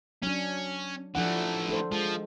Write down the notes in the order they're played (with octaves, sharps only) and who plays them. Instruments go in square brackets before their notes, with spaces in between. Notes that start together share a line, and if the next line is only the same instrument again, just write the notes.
[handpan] F#3 D4 [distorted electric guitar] C#4
[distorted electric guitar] E3 A3 [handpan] F3 D4 F#5
[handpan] D4 A4 C5
[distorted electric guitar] F3 [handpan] G#3